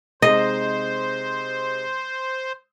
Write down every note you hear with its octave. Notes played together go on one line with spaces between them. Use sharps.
C3 G#3 D#4 C5 D#5